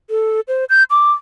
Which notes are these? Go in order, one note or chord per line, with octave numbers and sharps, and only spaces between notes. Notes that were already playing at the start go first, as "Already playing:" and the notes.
A4
C5
G6
D6